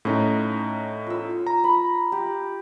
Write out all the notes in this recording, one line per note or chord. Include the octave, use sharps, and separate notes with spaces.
A2 C#4 D#4 F5 A#5
F4 E6
A#5
B5
G4